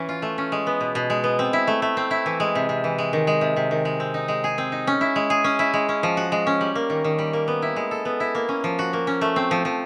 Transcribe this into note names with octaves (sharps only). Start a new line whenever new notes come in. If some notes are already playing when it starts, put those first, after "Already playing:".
Already playing: E3 C#4
F4
A3
C#4
G#3
B3
B2
B2
G#3
B3
C4
E4
A3
A3
C4
E4
E3
G#3
C3
C3
E3
G#3
D#3
G#3
C3
C3
D#3
G#3
C4
D#4
G#3
G#4
C4
D#4
C#4
E4
G#3
G#4
C#4
E4
G#3
C#4
F3
F#4
G#3
C#4
G3
A#3
D#3
D#3
G3
A#3
B3
E4
G#3
A4
B3
E4
A#3
C#4
F3
F#4
A#3
C#4
A3
C4
F3
F3